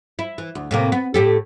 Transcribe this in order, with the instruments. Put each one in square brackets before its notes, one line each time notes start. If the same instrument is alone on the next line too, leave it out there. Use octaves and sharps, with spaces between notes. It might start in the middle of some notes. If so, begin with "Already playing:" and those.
[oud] E4
E3
D2
A2 C3 A#3
B3
A2 G4 A4